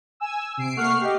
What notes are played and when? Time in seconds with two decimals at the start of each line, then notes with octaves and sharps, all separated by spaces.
0.20 G#5 E6
0.57 C3 C7 D7
0.76 A3 A#3 F#5 C#6 F6 C7
1.01 G4 D#5